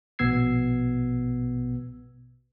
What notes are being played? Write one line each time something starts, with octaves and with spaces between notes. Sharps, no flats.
A#1 B2 B3 E6 G#6 C7